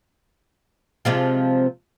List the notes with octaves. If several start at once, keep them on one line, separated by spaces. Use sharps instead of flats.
C3 F3 G#3